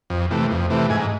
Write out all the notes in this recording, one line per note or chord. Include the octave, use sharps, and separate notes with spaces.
F2
C3 E3 A3
F2
C3 E3 A3
G#2 G#5